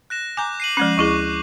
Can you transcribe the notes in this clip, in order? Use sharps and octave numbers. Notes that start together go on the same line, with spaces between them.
F#6 A#6 E7
G#5 A#5 D6 G6
C7 D#7 F#7
F3 G#3 C#4 F#6
D2 E4 G#4 C#6 D6